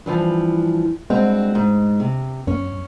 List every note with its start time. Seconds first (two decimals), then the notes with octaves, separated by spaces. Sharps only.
0.06 G2 E3 F3
1.10 G2 G#3 C4 F#4
1.55 G#2
2.00 C3
2.47 F#2 C#4